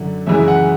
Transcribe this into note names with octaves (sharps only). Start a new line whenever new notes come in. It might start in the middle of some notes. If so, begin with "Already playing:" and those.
Already playing: F#2 D3 F#3
F#2 C#3 E3 G#3 E5
F#5